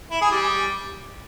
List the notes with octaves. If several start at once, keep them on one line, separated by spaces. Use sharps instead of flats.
E4
G#4
G3